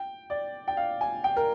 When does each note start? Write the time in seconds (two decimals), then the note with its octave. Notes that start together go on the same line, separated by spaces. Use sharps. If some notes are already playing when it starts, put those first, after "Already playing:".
Already playing: G5
0.30 D5
0.68 G5
0.77 F5
1.01 G#5
1.24 G5
1.36 A#4